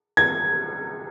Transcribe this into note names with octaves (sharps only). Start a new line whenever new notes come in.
G#6